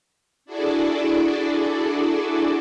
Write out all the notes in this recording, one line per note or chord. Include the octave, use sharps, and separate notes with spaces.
D4 E4 F#4 G#4 A4 D5